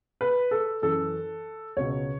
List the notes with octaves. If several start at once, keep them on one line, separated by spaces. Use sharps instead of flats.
B4
A4
F#2 E3 A4
C#2 B2 C#5